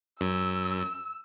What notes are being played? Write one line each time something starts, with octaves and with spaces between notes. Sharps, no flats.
F#2 E6